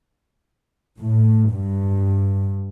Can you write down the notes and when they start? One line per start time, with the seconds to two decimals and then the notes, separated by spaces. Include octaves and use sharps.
1.00 A2
1.54 G2